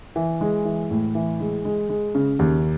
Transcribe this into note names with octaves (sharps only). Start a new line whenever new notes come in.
E3
G#3
E3
A2
E3
G#3
G#3
G#3
C#3
D#2